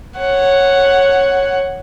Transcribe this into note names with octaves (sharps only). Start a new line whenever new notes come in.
C#5 F#5